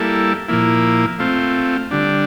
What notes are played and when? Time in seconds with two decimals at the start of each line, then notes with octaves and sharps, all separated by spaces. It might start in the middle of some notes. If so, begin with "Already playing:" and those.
Already playing: G3 A#3 E4 A4
0.49 A#2 F3 A#3 E4
1.19 A3 C4 F4
1.91 D3 G3 D4